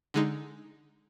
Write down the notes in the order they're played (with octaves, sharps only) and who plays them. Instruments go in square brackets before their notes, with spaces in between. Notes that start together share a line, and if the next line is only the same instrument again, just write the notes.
[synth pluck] D3 G#3 D#4